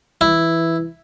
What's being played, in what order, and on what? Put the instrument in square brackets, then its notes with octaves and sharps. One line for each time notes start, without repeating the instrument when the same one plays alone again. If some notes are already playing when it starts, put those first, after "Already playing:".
[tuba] E3 [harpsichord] E4